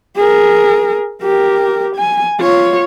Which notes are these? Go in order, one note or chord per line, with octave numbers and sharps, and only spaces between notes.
G#4 A#4
G4 A#4
G#5
F4 C#5